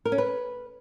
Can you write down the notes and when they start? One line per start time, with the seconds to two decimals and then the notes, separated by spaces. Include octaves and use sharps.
0.05 A#4
0.12 C#4
0.18 B4